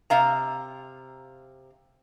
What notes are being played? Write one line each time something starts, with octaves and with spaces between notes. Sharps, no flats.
C3 F5 A#5